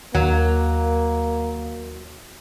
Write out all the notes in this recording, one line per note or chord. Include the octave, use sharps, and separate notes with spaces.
D#2 F#3 A#3